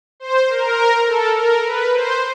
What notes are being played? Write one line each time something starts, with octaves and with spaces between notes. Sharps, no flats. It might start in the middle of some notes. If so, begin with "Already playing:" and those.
C5
A#4
A4
A#4
B4
C5